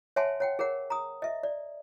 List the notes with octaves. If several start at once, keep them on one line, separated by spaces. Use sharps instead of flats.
C#5 E5 F#5 G#5 A5 C6
C#5 F#5 G5
G#4 A#4 C#5 F#5
A#5 D#6
D#5 E5
D5